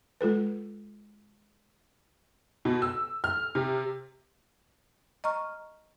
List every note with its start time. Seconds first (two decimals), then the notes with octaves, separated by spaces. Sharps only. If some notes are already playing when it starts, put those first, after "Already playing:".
0.21 G#3 F4 A4 B4
2.65 B2
2.82 E6
3.24 F6
3.55 C3
5.24 D#5 A#5 C#6 F6